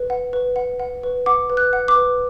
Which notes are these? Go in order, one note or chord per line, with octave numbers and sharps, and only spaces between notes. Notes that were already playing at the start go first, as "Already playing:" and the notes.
Already playing: B4
F#5
B4
F#5
F#5
B4
F#5 D6
B4
F#6
F#5
D6
B4